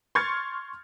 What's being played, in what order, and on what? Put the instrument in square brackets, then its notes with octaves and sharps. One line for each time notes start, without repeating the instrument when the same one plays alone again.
[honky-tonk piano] C6 C#6 F6 G#6 A6 C#7